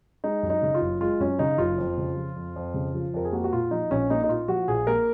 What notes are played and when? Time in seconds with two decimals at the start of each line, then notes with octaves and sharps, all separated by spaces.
0.24 G#3 D#4
0.43 F#2
0.50 D#4
0.62 C#3
0.74 F4
0.81 F#1
1.01 G#3 F4
1.20 F#2 C#4
1.39 C#3 D#4
1.58 F#1 F4
1.78 F2
1.97 C#3
2.17 F3
2.36 F2
2.56 F2
2.74 C#3
2.94 F3
3.14 F2 A#4
3.25 G#4
3.32 A#3 F#4
3.44 F#4
3.52 A#2 F4
3.71 F3 D#4
3.91 A#1 C#4
4.10 A#3 D#4
4.23 D#4
4.29 A#2 F4
4.48 F3 F#4
4.68 A#1 G#4
4.87 A#3 A#4